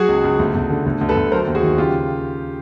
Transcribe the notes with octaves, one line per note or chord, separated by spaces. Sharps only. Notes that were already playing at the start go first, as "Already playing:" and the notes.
Already playing: F#3 F#4 G#4
C#2
C#2
D2
D2
D3
D2
D2
A4 B4
D2
F#3 A#4 C5
D#2
F#4 G#4
D#3
C#3 F4 G4